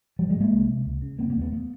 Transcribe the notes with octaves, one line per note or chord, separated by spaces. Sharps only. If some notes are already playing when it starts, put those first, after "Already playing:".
G#1 F3 G3
F#3 G#3
G#2
G#3 A#3
C2
C3
C#2
C#3
F1 A#3 C4
A#3 C4
D#2 D3
A3 B3
A3 B3